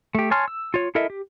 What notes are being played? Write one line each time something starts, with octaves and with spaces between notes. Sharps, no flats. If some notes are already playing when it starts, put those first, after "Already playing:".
A3 G4
C#5 G#5 A5 C6 F6
E6
F4 C#5
E4 A4 A#4 D#5 E5
G4